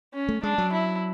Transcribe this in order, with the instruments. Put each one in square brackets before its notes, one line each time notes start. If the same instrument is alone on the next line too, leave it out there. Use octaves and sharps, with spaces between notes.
[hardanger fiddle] C#4
[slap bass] A3
[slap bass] G#3 [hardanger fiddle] D4
[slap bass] F#3
[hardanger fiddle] E4